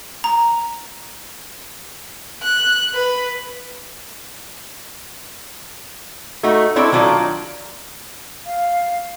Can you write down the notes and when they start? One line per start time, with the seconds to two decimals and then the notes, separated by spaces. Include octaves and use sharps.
0.24 A#5
2.43 F#6
2.94 B4
6.43 A3 D#4 F#4
6.76 C4 D4 E4 A4 C#5
6.92 D#3 F#3 D4 D#4 F4
8.46 F5